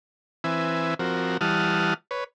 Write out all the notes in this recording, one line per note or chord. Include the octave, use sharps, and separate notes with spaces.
E3 C4 B4 E5 G#5
F3 C4 F#4 A#4
E3 G3 F#5 A5 D#6 F6
B4 C#5